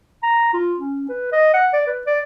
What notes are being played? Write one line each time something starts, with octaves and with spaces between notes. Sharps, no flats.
A#5
F4
C#4
B4
D#5
F#5
D5
B4
D5